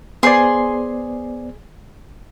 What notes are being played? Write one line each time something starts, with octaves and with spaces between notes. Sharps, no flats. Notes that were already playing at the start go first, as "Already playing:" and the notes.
B3 G#4 C5 D5 C6